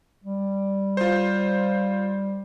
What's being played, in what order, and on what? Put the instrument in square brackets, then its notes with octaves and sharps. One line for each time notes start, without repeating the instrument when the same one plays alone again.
[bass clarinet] G3
[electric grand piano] F4 C5